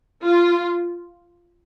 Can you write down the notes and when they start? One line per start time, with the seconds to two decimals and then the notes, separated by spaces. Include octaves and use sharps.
0.23 F4